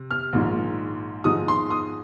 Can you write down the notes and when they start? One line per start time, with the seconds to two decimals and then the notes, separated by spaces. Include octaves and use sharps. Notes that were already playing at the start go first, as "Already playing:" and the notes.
Already playing: C3
0.11 F6
0.33 A#1 G#2 D#3
1.24 G#2 F3 G#3 D#4 D#6
1.48 C6
1.70 D#6